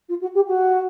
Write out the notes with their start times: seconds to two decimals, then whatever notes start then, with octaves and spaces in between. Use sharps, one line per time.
0.09 F4
0.21 F#4
0.35 G4
0.47 F#4